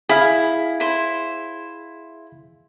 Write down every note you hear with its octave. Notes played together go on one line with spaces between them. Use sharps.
E4 G#4 F5
E4 C5